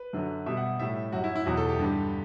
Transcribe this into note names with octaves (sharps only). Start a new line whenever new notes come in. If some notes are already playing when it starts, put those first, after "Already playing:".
Already playing: B4
F#2 D3 F#3
B2 G3 E5
F#5
A2 G3 E5
F#2 F#3 F#4
E4
E4
E2 B2 F#3 F#4
A4
G4
G2 D3 G3